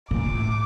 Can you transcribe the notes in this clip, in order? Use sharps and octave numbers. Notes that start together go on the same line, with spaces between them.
A#2 D6
A#2
A2